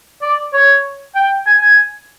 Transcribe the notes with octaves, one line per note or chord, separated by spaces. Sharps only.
D5
C#5
G5
G#5
G#5